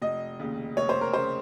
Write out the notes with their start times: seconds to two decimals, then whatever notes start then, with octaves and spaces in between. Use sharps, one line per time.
0.02 F1 D#5
0.39 D#2 C#3
0.77 F1 C#5
0.89 C5
1.01 A#4
1.13 C#3 C5